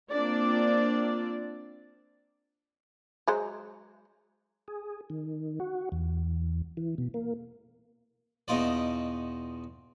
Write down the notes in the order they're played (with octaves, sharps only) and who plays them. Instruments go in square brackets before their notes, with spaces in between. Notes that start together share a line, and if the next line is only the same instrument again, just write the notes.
[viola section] A#3 C4 D4 F4 D5
[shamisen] F#3 G#3 C5
[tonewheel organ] G#4
D#3
F#4
E2
E3
B2
A#3
[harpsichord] E2 B2 D#4 F4 D5